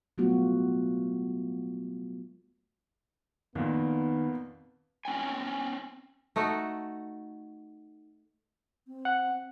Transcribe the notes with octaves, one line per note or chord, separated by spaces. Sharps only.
F#3 G3 A3 B3 F4 F#4
F2 A#2 D#3 B3
C4 C#4 G5 G#5
A3 D#4 F#4 A4
C4
F#5